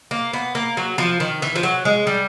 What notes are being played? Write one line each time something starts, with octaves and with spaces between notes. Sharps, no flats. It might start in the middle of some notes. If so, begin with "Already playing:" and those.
A#3
B3
A#3
F#3
F3
D#3
E3
F3
F#3
G#3
G3